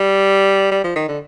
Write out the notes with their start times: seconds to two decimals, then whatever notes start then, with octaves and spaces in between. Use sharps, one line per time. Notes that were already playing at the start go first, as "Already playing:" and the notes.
Already playing: G3
0.72 G3
0.84 F3
0.96 D#3
1.08 D3